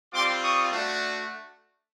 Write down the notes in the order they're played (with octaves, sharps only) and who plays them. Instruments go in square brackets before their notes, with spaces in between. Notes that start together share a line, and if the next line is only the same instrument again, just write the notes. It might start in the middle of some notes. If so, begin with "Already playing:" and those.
[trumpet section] G3 C4 F4 C6 D6
C#6 D#6
A3 D4 F#4